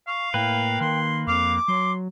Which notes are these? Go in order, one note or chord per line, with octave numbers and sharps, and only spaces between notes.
F5 C#6
A2 A#3 B4 G5
D#3 C6
F2 F5 D6
F#3 C6